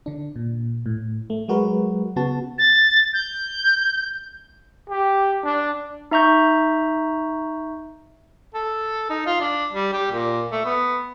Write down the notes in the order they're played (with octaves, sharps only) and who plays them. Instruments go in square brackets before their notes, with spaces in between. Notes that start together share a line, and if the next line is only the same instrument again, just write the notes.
[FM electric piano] D3 D4
A#2
A2
A3
F#3 G#3 F#4 A#4 B4
C#3 B3 F#4 A5
[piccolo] A6
G6
[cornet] G4
D4
[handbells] D#4 E5 A#5 C#6 G6
[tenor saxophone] A4
D#4
F4
D4
G3
G4
A#2
A3
B3